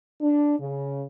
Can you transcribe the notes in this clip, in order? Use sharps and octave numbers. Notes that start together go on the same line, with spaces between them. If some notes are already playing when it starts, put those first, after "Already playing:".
D4
C#3